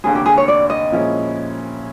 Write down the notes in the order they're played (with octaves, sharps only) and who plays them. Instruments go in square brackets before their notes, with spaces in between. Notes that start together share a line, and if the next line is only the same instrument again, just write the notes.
[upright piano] F1 D#2 D3 [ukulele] G#4
[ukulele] G4
G#4
C#5
D5
D#5
[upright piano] A#2 F3 G#3 C#4 E4